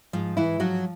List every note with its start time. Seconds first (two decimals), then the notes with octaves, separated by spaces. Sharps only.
0.13 G#2 F3 F4
0.37 E3 E4
0.59 F3 F#3 F#4